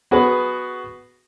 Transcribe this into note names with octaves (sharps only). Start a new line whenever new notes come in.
B3 F#4 G#4 B4